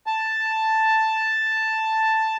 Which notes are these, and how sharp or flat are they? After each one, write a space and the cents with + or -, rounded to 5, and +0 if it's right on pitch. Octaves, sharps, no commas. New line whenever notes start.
A5 +5